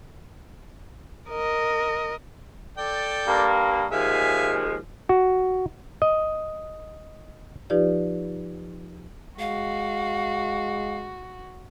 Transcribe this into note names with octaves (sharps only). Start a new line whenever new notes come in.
A#4 D#5
A4 D5 G5
G2 A#3
D#2 F3 G#3 E5 F5 G#5
F#4
D#5
F3 D#4 F4 G4 B4 D5
G#3 F#4 F5